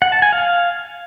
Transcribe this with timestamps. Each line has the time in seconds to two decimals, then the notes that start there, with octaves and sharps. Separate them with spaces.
0.02 F#5
0.12 A5
0.22 G#5
0.33 F5